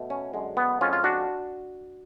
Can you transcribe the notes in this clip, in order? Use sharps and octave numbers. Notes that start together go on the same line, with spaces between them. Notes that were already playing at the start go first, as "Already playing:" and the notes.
Already playing: B2 A3
C#4
F#2 D3 G#3
B3
F2 F3 G#3 C#4 F4
F4
D4 F#4